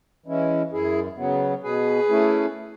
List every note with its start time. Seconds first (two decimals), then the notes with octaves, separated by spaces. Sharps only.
0.26 E3 G#3 C#4 E4
0.72 F#2 E4 G#4
1.17 C#3 F#3 B3
1.63 B2 G#4 B4
2.09 A3 C#4 E4